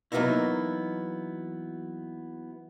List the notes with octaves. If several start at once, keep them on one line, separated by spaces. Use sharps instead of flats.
E3 F#3 A#3 B3 D#4 E4